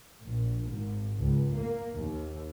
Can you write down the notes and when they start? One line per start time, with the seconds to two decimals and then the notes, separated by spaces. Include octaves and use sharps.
0.23 A#1
0.68 G#1
1.19 C#2
1.53 A#3
1.94 D#2